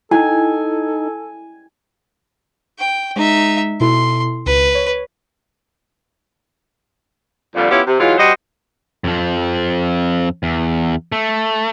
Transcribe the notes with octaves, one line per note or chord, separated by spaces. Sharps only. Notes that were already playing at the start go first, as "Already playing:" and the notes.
D#4 E4 A4 G#5
G5
G#3 D#4 E5
B2 E4 A4 C6
C#2 B4
C#5
F2 A#2 D3 G3
B3 C#4 E4 F4 G4
C3
E3 F#3 G#3 F4
G3 F#4 C5 D#5
F2 F3
E2
A3